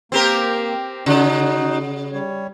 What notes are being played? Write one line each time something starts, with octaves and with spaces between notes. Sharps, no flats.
A#3 C4 G4 A#4
C#3 D#4 F#4
G3 C#5